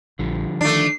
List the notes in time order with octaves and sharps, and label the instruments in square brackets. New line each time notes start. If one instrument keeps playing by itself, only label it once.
[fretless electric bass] A#1 [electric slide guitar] D3 F3 G3
[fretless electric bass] D#3 [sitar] A3 D4 [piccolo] C7